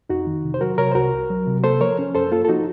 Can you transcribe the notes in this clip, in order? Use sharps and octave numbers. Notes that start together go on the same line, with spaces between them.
F2 D#4 F#4
D#3
C3
C5
F#3 F#4 A#4
C3 A#4 C#5
C5
C2 F#4 A#4
C2
F#3
C3
A#3 A4 C5
F3 A#4 C#5
C#4
F#2 A4 C5
A#3 F4 A4
A4
F3 D#4 F#4